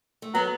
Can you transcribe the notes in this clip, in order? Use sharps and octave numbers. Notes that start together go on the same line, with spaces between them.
A3
F#3 B3